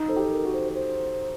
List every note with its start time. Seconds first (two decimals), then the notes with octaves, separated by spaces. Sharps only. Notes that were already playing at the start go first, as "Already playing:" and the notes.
Already playing: D#4
0.08 A4 C5
0.16 G4
0.31 A#4
0.45 F#4
0.53 C5
0.74 C5